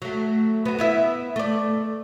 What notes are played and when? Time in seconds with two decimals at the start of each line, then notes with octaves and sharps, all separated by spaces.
0.02 F#3 A3
0.65 B3 F#4
0.79 B3 E4 E5
1.36 A3 D5